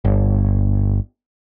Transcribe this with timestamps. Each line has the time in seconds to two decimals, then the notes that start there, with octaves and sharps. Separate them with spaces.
0.05 G1